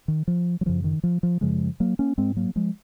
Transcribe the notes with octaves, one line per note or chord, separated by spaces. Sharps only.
D#3
F3
F#3
F#2 C#3 F3
D#3
F3
F3
F#2 C#3 F3 G#3
F#3 A#3
A#3 C#4
G#2 G#3 C4
F#3 A#3
F3 G#3